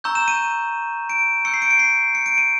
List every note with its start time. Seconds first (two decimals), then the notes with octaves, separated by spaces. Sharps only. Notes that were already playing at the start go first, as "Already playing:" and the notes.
0.04 A#5 C#6 E6 G6
0.15 E7
0.28 D#7
1.10 D7
1.45 C#6 E6 G6 C#7
1.54 C7
1.62 D7
1.71 C#7
1.79 C7
2.15 C#7
2.26 D7
2.38 D#7